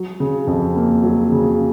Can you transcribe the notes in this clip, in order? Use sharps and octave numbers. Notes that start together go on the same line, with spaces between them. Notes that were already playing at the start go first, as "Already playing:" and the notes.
Already playing: F#3
C#3
F2
A#3
F#3
C#3